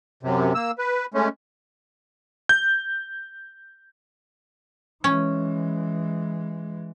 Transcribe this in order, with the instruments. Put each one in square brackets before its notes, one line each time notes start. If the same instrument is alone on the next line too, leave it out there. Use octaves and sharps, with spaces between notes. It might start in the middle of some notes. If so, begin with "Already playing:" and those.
[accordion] F#2 C3
A#3 E6
B4
G#3 A3 C#4
[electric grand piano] G6
[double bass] E3 G#3 [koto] C#4